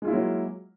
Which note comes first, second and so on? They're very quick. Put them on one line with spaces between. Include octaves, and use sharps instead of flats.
G#3 F4 E4 A#3 F#3